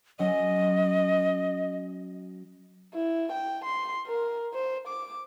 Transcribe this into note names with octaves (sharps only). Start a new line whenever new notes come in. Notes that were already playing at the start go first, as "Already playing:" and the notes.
F#3 C#4 D#5
E4
G5
C6
A#4
C5
D6